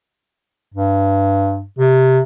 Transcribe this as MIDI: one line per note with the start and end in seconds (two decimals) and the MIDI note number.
0.75 1.64 43
1.79 2.19 48